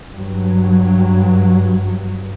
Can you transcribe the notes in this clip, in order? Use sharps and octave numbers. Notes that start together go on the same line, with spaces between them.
G2 F#3